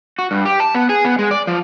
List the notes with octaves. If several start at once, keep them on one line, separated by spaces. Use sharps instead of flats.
F#4
G2
G4
A5
B3
G#4
B3
G#3
D5
F3